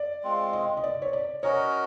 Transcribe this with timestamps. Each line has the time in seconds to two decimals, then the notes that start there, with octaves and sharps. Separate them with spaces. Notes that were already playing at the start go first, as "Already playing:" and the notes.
Already playing: D5
0.24 G#3 C4 F4
0.53 D#5
0.77 D#5
0.84 D5
1.02 C#5
1.13 D5
1.43 C#4 F#4 A#4 C#5 D#5